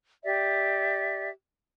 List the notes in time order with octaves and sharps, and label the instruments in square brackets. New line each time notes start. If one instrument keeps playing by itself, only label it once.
[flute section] G4 D5 E5